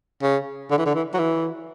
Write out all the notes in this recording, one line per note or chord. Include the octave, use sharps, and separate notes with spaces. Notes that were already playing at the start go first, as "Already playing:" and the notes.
C#3
D3
E3
D3
E3
F#3
E3